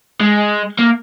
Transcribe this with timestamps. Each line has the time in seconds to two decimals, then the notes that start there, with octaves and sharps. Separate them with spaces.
0.20 G#3
0.78 A#3